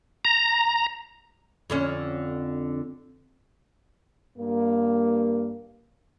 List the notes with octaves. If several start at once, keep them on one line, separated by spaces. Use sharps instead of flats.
A#5
F2 D3 C#4
G2 A#3